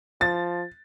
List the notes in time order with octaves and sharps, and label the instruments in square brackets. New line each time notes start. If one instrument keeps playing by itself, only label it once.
[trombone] F3 [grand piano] A6